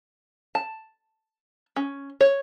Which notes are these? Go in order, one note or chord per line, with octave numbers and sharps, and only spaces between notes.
A5
C#4
C#5